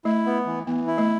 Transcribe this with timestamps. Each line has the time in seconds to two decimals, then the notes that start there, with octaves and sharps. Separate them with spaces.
0.05 A3 E4
0.26 B3
0.46 E3
0.67 E3 B3
0.87 E4
0.98 A3